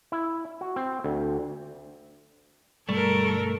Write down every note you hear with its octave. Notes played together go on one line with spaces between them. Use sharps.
E4
F#4
C4
D2
G2 B2 D3 G3 A3 A4 A#4